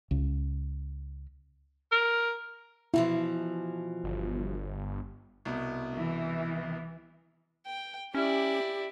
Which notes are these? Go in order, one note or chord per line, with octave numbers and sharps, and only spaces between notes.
C#2
A#4
B2 E3 F3 E4
G1
C2 B2
E3
G5
C#4 E4 G4 D5